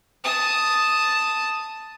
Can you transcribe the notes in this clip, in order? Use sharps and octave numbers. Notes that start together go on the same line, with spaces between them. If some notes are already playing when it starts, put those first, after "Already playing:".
A5 D#6